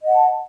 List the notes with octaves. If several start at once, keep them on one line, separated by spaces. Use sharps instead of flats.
D#5 F#5 A5